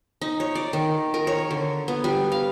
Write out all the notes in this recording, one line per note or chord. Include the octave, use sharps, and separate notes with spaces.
D#4
C#5
D5
D#3
A#4
C#5
D3
B3
G3
F5